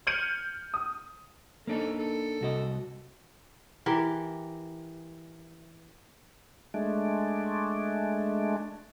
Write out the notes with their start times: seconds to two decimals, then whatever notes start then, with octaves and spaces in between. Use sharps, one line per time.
0.07 F6 G6 G#6 C#7 D#7 F#7
0.74 D#6
1.67 A#3 D4 D#4 A4
1.98 A4
2.41 C2 F#4 D#5
3.86 E3 G4 A#4
6.74 G#3 A3 D4